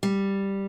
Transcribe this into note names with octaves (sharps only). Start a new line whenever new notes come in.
G3